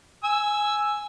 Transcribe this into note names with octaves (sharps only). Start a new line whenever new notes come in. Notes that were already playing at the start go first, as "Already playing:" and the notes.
G#5 E6